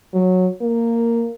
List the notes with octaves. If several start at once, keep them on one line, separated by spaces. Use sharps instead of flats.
F#3
A#3